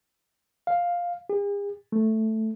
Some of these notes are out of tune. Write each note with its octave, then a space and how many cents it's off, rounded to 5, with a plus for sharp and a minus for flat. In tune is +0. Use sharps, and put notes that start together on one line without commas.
F5 +5
G#4 -45
A3 +0